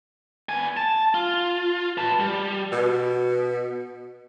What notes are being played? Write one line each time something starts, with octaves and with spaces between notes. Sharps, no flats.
B3 G#5
A5
F4
B4 A5
G3
B2